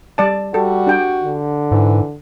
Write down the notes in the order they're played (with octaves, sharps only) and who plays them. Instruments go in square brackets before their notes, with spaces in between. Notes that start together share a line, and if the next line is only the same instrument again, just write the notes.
[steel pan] G3 D5 A5
[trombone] G3 [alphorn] F#4 [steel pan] A4
[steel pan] D4 G4 G5
[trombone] D3
[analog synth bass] G#2 [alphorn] E3